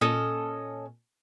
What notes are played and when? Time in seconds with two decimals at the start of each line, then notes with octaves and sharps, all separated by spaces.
0.01 A#2 C#4 A4 D#5